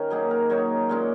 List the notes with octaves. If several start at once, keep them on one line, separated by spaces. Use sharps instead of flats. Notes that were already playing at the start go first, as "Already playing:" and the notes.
Already playing: D#3 C#4 A#4
F#3 A#3 D#4 G#4
A#4
F#3 A#3 D#4 C#5
A#2 G#3 C#4